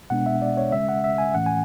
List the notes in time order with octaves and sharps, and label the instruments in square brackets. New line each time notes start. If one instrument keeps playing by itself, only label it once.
[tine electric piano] B2 G#3 B3 D4 F#5
E5
D5
C#5
C#3 G#3 C#4 E5
F#5
E5
G#5
A2 E3 A3 C#4 F#5
G#5